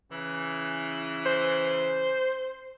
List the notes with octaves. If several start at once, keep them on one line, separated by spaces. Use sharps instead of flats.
C#3 E3
C5